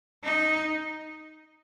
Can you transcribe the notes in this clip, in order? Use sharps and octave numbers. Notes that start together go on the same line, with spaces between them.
D#4